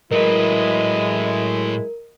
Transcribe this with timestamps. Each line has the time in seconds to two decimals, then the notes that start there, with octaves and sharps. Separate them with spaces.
0.11 A2 F#3 G#3 E4 A#4 B4 D#5